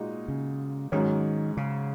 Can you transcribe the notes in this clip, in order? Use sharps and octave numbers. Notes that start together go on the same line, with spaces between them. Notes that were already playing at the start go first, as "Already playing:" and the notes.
Already playing: A#2 G#3 D#4 F#4
C#3
G#2 D#3 F#3 C#4
C#3